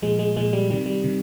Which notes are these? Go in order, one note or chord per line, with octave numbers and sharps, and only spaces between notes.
A#2 F3 G#3
G#3
A#2 F3 G#3
G3
C3 D#3 G3
G3
C3 D#3